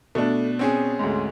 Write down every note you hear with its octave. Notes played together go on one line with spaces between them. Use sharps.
B2 A3 D4
C4 C#4 G#4
D2 G#2